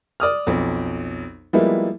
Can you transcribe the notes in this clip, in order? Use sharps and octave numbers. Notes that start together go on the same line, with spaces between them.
D5 D#6 F6
B1 F2
F3 G3 G#3 A#3 B3 E4